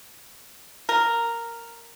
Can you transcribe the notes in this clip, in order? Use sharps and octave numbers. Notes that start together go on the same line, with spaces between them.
A#4